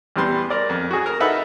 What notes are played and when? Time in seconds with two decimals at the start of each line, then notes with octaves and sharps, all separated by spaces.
0.16 E2 G3 B3 C6
0.50 A#4 D5
0.69 F2
0.91 F#4 G#4
1.06 A#4
1.20 D#4 A4 B4 E5 F#5